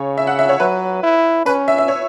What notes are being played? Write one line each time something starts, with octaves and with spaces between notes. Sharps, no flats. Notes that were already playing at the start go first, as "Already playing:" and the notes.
Already playing: C#3 C#5
E5
F#5
E5
C#5
F#3 B4
E4
C#4 B4
E5
E5
C#5